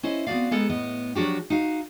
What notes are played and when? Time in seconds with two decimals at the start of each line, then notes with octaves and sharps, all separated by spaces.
0.03 C#4 E4 C5 D#5
0.27 B3 C4 D4 F#4 D5 F5
0.51 G#3 B3 A4 A#4
0.69 A2 B3 D#5
1.15 F3 F#3 D4 F#4 G4
1.50 D#4 F#4 F5